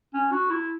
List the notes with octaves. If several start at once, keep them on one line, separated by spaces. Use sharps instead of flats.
C#4
F#4
E4